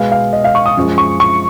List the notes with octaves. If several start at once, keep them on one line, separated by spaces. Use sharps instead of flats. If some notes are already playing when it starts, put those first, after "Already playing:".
Already playing: B2 G#3 B3 F5
F5
D#5
F5
C#6
D#6
F#2 F3 G#3
C#6
C#6